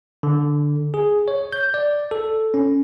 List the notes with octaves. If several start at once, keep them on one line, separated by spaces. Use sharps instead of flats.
D3
G#4
C#5
G6
D5
A4
C#4